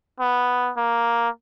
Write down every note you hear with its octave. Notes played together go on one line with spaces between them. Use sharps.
B3
A#3